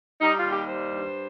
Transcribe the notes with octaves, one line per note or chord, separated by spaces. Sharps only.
G3 D#4
F4
D#2
G4
G3 C5
G2